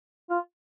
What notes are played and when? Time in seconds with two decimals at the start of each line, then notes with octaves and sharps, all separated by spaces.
0.30 F4